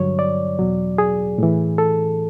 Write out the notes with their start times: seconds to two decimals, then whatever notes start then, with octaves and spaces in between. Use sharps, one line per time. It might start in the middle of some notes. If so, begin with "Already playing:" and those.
Already playing: G2 D3 F#3 C#5
0.19 D5
0.59 E2 B2 F#3
0.98 G#4
1.38 A2 E3
1.78 A4